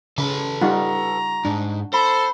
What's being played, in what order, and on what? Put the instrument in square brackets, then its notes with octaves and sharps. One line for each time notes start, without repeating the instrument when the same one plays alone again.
[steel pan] C#3 [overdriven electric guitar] A4 B4
[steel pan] G3 D#4 F4 [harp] F#5 C#6 [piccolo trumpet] A#5
[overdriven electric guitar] G#2 [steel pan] D4
[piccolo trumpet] A4 [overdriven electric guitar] C5 [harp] B5